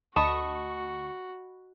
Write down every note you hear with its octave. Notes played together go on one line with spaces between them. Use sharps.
D2 F#4 D#5 A5 B5 C#6 D#6